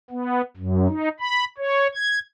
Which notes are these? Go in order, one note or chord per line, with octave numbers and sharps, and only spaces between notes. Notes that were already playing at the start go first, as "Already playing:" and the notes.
B3
F#2
D#4
B5
C#5
G#6